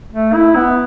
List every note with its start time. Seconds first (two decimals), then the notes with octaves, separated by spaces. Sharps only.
0.13 A3
0.34 E4
0.56 B3